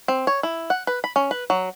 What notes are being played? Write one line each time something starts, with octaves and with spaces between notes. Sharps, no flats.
C4
C#5
E4
F#5
B4
B5
C#4
B4
F#3